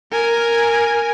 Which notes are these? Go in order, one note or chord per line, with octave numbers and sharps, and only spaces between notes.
A#4 G#5